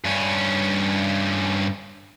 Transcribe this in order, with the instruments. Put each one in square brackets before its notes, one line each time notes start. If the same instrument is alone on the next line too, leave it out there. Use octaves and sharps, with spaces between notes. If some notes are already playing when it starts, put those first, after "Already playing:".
[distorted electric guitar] G2 C#4